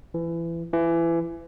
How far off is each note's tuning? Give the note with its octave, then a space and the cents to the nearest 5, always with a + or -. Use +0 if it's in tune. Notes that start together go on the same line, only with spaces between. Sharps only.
E3 +25
E3 +25